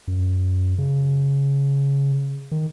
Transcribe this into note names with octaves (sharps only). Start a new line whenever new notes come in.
F#2
C#3
D#3